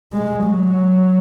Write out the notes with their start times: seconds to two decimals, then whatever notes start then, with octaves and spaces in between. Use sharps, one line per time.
0.13 G#3
0.47 F#3